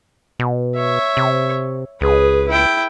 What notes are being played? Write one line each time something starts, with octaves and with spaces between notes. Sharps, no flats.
B2
C#5 E5
C3
C#2 G#4 B4
E4 G5